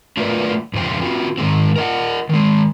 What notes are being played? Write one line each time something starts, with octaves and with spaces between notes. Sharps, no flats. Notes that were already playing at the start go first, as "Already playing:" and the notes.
F#3 A3 F4 A#4 B4 D5
F2 C#3 C5 G5
C4 F4 F#4
G#2 D#3 G#3 C4
A#4 D#5 F#5
D#3 G#3